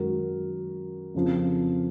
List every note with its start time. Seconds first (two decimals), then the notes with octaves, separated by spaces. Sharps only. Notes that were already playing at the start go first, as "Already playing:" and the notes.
Already playing: F#2 D#3 G#3 F#4 A#4
1.14 F2 C#3 F3